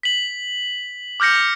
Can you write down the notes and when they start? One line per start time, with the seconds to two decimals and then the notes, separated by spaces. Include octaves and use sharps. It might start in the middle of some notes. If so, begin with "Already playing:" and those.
0.03 B6 F#7
1.20 D6 F6 G6 A#6 C#7